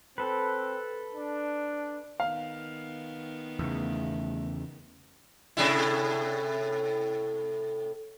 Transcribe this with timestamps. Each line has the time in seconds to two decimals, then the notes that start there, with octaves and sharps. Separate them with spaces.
0.18 C4 A4 B4
1.15 D4
2.20 D#3 B3 F5
3.59 E2 C#3 A3
5.57 A2 C3 E4